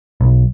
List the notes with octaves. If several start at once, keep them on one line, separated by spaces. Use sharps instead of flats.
B1